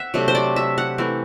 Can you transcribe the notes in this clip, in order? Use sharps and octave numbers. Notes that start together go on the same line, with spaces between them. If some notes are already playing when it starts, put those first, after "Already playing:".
Already playing: C4 E5 F#5
C3 F#3 A3 D4
C5
D5
E5
F#5
E3 A3 C4